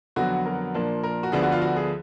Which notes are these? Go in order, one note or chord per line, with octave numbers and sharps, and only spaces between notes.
F2 D3 F#3 B3 F#4
A#4
A#2 F3 A#3 D4
A#4
F#4
D2 D3 F3 B3 D4 G#4
F#4
F4
F#4
G#4